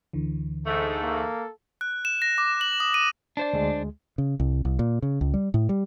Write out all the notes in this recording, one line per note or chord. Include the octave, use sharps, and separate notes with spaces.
D2 D3 E3
G#2 A3 A4
A#3
F#6
E7
A#6
D6
F#7
D#6
D#7
D4 C5 D5
D2 G#3
C#3
C2
C2
A#2
C#3
C#2
G3
A2
G3